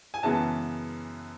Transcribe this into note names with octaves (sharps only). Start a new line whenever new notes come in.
G#5
F#2 C#3 E3 G#3 B3 A5